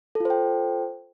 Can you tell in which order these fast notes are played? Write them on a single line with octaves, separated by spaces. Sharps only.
A4 F4 C5 G5